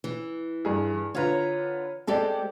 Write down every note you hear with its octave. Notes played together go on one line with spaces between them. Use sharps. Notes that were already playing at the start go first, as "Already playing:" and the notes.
E3
G2 G#4
D3 F4 B4 C#5 A#5
G#3 C4 G4 A4 D5